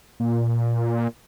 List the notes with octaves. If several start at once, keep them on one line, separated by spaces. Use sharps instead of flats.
A#2